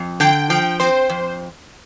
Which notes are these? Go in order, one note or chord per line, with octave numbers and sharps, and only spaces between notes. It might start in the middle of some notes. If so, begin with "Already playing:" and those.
Already playing: F2
D3 G5
F3 G5
C4 C5
F2